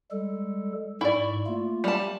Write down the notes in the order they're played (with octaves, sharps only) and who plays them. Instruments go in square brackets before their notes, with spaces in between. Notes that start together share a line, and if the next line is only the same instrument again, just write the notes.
[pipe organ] G3 G#3 A4
[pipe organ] G#2 C#6 [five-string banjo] E4 D5
[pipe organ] A3 A#3 F4
[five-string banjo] G3 A5